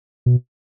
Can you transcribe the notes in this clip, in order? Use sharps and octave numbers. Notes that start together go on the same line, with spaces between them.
B2